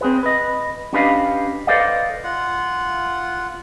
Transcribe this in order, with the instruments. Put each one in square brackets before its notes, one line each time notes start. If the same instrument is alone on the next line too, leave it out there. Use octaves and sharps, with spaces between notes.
[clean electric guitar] C4 G#4 B4
B4 D#5
C#4 D4 G4 B4 D#5 F5
A4 B4 C5 D5 D#5 F5
[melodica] F4 F#5